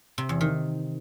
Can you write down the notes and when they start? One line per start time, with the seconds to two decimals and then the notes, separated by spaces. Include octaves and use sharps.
0.18 C3
0.29 E2
0.41 D#3